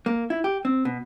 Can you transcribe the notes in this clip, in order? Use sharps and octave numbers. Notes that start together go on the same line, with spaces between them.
A#3
E4
G4
C4
B2